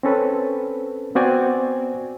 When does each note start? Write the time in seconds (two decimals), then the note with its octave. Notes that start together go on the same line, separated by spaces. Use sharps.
0.03 C4 C#4 A4 B4
1.15 B3 C4 F#4 D5 G#5